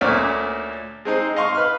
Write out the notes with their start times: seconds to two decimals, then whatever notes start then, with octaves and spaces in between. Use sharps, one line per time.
0.01 D2 A#2 A3 C#4 D5 F6
1.05 G#3 C4 D#4
1.36 D#5 F5 C6 C#6
1.55 B4 F6